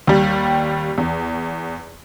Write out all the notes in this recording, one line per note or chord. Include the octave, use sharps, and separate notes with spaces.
D#2 G3
E2